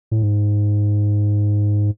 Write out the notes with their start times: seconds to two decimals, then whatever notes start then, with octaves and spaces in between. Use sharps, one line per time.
0.11 A2
0.22 G#2